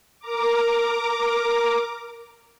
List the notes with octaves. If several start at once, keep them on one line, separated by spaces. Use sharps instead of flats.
A#4 A#5 D6